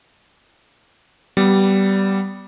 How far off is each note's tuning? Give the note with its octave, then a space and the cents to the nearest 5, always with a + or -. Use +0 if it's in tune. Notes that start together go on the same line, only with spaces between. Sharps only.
G3 -15 B3 +0